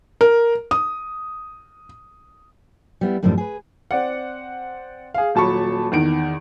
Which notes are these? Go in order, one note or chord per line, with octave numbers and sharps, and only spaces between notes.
A#4
D#6
G3 B3 E4
F#2 A2 D#3 F3 G3 D4
G#4 B4
C4 D5 F#5
G#4 F5
D#1 F#3 A5 B5 C#6
E2 D#3 D7